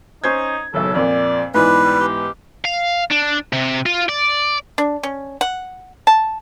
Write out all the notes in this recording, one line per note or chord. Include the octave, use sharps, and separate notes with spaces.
C#4 D#4 C5 G#6
F#1 B1 A4
F2 A#2 D5
G#2 E3 B3 D4 B4
G3
G4
F5
D4
C3
F4
D5
D4
C#4
F#5
A5